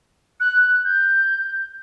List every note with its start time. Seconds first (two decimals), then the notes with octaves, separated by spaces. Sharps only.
0.40 F#6
0.85 G6